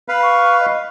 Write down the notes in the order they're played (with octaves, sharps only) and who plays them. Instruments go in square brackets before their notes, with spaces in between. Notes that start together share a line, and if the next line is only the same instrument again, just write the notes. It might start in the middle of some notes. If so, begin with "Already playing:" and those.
[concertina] B4 F5 [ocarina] B5
[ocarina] C#6
D#5